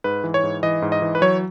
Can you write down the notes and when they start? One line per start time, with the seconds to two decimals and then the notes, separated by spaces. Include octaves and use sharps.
0.04 G#2 B4
0.24 E3
0.34 C#5
0.43 G#2
0.63 E3 D#5
0.82 G#2
0.92 D#5
1.02 E3
1.15 B4
1.22 F#3 C#5